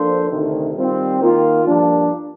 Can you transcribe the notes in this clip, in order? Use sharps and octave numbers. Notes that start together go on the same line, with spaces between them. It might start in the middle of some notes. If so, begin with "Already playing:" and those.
Already playing: F3 A#3 D4 A4 C5
D2 C3 D#3
D#3 G3 C4 F4
D#3 A#3 F4
G2 F3 A#3 D4